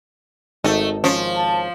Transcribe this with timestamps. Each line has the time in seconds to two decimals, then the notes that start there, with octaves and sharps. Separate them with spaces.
0.64 G#1 A3 D#4 A4
1.04 F3 C#4
1.36 A5